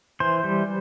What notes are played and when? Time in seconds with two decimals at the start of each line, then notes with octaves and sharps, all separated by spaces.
0.20 E3 C5
0.44 G3